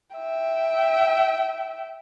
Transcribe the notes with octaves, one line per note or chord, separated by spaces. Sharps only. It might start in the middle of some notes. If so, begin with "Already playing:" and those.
E5 G5